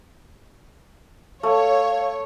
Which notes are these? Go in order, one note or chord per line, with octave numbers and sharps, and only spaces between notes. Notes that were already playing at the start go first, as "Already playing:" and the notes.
A3 C#5 F5